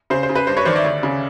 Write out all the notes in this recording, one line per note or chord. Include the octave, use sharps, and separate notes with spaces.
C#3 C5
C5
C#3
B4
G2 C5
B4 C#5
D#3 C5 D5
D5 E5
D2
C#3